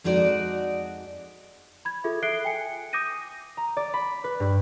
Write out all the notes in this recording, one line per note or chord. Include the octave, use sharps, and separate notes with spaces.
F2 G#3 D#4 F#4 D5 D#5
B5 G#6
F4 G#4 A4 E5
A4 E5 F#6 C7 D7 G7
G5 G#5 C#7
D6 D#6 G6 A#6 D#7
A#5
D5
B5
B4
G2